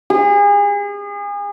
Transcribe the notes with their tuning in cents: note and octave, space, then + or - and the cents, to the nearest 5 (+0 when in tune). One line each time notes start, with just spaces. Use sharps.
G#4 -35